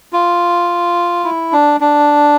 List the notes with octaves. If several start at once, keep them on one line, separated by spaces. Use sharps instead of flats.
F4
E4
D4
D4